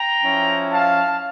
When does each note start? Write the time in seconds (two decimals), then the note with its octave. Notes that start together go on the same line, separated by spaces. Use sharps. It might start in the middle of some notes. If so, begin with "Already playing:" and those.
Already playing: G5 A#5
0.21 F3 C#4 E4
0.71 F5 A5